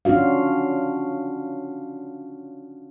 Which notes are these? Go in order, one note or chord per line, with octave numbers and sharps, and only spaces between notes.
C#4 D4 F4 F#4 F5